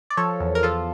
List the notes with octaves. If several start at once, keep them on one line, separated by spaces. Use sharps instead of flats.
D5
F3 A4 C#5
E2
A#4
F3 F4 A4